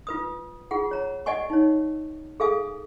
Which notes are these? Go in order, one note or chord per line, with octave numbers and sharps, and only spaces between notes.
F4 B4 D#6
F4 G#4 F#5
C#5 A#5
D5 D#5 F#5 G#5 C#6
D#4 C#5
G#4 A4 F5 G#5 D#6